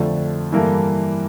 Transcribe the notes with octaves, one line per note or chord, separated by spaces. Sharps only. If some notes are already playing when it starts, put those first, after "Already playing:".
Already playing: F2 D3 F3 A3
G2 E3 A#3 E4 A4